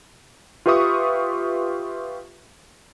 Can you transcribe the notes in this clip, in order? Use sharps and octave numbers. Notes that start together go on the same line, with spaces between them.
F4 G4 B4 E5 C#6 D#6